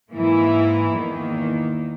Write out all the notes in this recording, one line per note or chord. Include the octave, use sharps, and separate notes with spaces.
G#2 E3 A#3 E4
E2 D#3 A#3